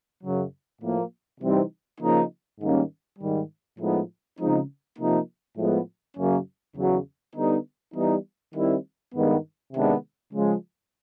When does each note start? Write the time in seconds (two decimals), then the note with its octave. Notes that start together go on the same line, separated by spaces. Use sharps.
0.22 F#2 C#3 F#3
0.82 A2 F3 A#3
1.41 C3 E3 G3 C4 D#4
2.01 C#3 F3 A#3 D#4
2.60 G#2 D#3 G3 A#3 C#4
3.19 G#2 D#3 G3
3.79 A2 F3 G#3 B3 D#4
4.39 C#3 F3 G#3 C4 D#4
4.98 C3 F3 A#3 D#4
5.58 A2 F3 G#3 B3
6.17 F#2 C#3 F#3 A#3 C#4
6.77 E2 C#3 F#3
7.36 D3 G3 B3 D#4
7.95 E3 G3 B3 D#4
8.55 D#3 G3 C4 E4
9.14 G2 D#3 G#3 B3
9.73 C3 D#3 G#3 B3 D4
10.33 C#3 F3 G#3